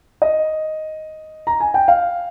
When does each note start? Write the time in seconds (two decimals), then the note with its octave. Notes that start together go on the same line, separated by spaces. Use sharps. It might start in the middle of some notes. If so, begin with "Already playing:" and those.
0.22 D#5
1.47 A#5
1.60 G#5
1.74 G5
1.88 F5